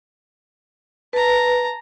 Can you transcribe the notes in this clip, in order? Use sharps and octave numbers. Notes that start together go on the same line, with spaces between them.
B4 A5 A#5